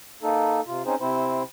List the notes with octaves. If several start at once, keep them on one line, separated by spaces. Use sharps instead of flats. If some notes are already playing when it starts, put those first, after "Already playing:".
A#3 D#4 A4
C3 F4
C4 C#4 D#4 G#4 C5
C3 C4 E4 C5